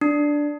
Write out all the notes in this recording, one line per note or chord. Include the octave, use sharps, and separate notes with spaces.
D4